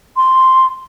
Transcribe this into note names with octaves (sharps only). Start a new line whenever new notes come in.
C6